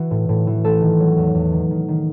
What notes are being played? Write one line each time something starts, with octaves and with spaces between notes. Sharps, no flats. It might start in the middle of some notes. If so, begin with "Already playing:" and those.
Already playing: E3 F#4
A2
A2
E3
A3 A4
D#3
F#3
E2
E2
D#3
D#3
D#3